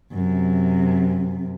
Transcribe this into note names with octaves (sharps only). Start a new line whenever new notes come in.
F#2 C3